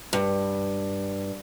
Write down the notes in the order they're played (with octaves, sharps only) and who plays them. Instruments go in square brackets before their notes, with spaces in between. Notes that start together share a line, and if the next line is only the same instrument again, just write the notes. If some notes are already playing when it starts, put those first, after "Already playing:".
[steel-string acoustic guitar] G2